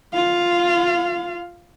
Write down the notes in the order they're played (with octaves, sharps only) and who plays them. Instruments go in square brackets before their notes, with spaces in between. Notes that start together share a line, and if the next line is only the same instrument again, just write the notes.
[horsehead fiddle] F4 F5